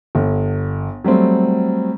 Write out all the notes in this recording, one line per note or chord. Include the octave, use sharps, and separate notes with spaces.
G1
F#3 G3 A3 C4